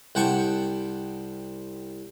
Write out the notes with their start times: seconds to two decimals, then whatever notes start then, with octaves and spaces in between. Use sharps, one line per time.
0.15 C2 F#5 G5 A5 C#6